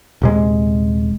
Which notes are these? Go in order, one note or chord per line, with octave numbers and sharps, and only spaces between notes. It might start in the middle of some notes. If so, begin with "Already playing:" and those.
D#1 C3 G#3